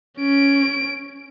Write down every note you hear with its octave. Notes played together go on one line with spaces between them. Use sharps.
C#4 D7